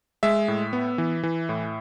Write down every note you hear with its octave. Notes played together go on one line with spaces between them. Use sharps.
G#3 E5
A2
B3
E3
E3
A2